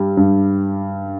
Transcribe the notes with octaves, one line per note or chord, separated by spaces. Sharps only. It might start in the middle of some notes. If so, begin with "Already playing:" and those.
Already playing: G2 G3
G2